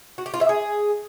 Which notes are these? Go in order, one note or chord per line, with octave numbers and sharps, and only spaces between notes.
F#4
G4
F4
E5
G#4